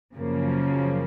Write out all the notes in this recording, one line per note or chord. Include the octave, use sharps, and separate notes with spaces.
F#2 C#3 F3 A#3